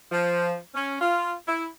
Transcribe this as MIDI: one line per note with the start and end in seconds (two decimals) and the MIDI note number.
0.12 0.55 53
0.74 0.96 61
0.99 1.33 65
1.47 1.65 64